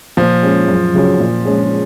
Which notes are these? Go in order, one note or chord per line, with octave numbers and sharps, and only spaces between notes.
A#2 F3
G#3 C#4 G#4
F#2
C#3 F#3 C#4
A#2
G#3 C#4 G#4